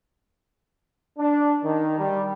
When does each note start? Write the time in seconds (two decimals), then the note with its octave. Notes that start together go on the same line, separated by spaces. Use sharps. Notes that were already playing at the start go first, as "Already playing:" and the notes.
1.18 D4
1.63 D#3
1.99 G3